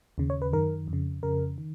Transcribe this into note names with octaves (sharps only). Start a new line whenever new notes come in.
D#2 C#3
C#5
B4
F#2 D#3 A#4
F2
C#3
F2 C#3 A#4
D#3